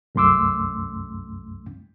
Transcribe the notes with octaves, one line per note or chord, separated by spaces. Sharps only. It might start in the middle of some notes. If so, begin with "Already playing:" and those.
C2 F#2 A3 C6 D6 E6